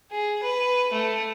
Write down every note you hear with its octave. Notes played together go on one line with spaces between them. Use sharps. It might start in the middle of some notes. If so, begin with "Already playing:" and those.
G#4
B4
A3